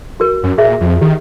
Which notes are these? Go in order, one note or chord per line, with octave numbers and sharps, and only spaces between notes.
F#4 A#4
F#2
A#2 G#4 E5
F2
D#3 G4